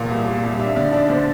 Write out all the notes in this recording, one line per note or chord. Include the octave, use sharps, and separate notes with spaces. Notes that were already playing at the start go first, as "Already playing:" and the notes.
Already playing: E2 A#2 F5
C2
A#2
C2
D4 E5
D3 D5
D4 D5
D3 C5